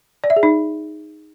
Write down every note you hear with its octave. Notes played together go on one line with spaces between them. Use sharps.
D5
E5
G#4
D#4